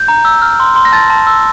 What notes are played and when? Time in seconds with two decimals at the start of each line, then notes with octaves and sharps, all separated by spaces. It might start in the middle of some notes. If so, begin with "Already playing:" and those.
Already playing: G6
0.08 A#5
0.25 E6
0.42 F6
0.60 C6
0.76 C6
0.85 A#6
0.92 A5 A6
1.10 A5
1.27 E6